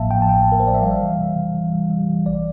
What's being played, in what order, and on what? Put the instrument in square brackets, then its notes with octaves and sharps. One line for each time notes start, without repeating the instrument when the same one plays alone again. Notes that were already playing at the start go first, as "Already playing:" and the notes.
Already playing: [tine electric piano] A1 A2 F3 A#3 E5 F5 A5
A2 G5
A5
A1 G5
A1
A#4
C5
F3 D5
E5
G3 F5
E3
C3
C3
E3
G3
G3
E3
A1 D5